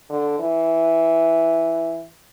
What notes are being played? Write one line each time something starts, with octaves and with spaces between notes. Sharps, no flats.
D3
E3